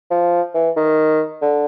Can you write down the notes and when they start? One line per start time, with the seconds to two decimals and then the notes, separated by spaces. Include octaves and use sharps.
0.10 F3
0.54 E3
0.76 D#3
1.42 D3